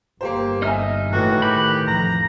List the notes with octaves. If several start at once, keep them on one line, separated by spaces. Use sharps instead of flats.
G1 A#3 G4 C5
D#4 D#5 E5 G#5 F6
A2 D#3 E3 F#4
G4 B5 F#6
A1 F2 A#5